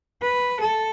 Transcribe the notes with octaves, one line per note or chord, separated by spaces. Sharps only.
B4
A4